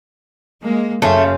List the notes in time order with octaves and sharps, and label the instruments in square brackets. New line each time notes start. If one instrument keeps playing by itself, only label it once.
[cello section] G#3 A#3
[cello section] F#2 [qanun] C#3 C5 F5 [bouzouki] A3